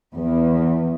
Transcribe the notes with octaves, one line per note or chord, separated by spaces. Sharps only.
E2